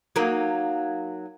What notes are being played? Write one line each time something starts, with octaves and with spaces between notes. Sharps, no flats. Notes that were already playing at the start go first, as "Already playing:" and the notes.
F#3 A#3 D#4